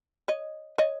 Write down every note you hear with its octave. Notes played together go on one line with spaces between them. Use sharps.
C#5 D#5
C#5 D#5